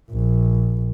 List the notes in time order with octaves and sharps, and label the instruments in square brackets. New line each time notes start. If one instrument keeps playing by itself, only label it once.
[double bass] A#1